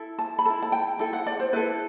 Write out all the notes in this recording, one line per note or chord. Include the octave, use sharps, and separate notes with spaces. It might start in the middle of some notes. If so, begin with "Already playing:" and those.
Already playing: E4 A4
A5
B5
E4 A4 A5
A5
G5
E4 A4 G5
F#5
D5
C5
E4 A4 B4